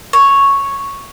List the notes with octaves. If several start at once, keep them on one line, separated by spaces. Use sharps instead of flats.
C#5